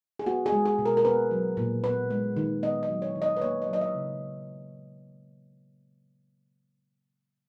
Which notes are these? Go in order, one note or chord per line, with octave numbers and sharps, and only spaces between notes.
G#4
B3 F#4
G#4
G#3
G#4
B2
A#4
A#4
B3 B4
F#3
A#2
B3 B4
G#3
D#3
B3 D#5
D#5
F#3
C#5
D#3
D#5
B4
A#3 C#5
D#5
F#3
D#5
E5
C#3